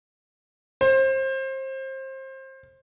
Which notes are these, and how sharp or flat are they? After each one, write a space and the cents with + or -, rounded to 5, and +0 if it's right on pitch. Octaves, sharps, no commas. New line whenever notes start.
C5 +25